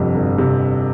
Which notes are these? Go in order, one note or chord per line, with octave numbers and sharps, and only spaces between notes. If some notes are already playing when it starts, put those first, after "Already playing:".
Already playing: G1 F2 C3
G1
C3